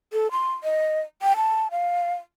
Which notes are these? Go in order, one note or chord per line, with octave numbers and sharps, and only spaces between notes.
A4
C6
D#5
G5
A5
F5